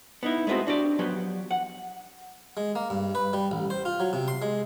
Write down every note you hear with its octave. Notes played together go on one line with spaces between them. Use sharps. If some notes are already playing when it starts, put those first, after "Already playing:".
B3 D#4 E4
G#3 A3 B3 C4 F#4
D4 F#4 G4 D5
F3 F#3 B3 G4
F#5
G#3
A#3
G2
B4
G3
A1
C5
F4
F#3
C3
C6
G#3